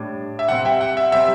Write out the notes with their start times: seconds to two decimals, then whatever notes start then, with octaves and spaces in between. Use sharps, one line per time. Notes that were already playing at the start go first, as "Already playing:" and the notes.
Already playing: A2 G3 D4
0.39 E5
0.49 C3 G3 C4 F#5
0.65 E5 G5
0.81 F#5
0.97 E5
1.12 C3 G3 C4 E5